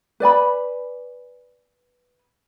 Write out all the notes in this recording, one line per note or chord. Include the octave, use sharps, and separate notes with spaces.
B4 D5 G#5 B5